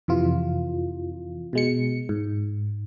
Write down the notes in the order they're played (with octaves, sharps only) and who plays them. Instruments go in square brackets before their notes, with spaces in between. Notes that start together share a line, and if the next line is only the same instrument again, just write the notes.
[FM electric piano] F2 C3 E3 F4
B2 G#3 C#7
G#2